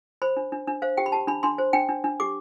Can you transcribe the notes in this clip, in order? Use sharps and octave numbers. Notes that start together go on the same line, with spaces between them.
C5 B5
D4
D4
D4
C5 F5
G4 G5
B5
G4 A5
D4 B5
D4 C6
C5
D4 G5
D4
D4
G4 D6